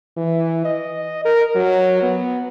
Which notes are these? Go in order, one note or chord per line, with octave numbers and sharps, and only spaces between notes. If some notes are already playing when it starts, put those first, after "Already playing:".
E3
D#5
A#4
F#3
B3